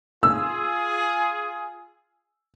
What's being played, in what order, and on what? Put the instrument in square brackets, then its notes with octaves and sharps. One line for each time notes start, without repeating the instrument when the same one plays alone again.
[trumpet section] F4 G#4 [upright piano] E6